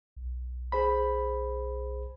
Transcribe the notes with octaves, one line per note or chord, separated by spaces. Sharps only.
B1
G#4 C5 B5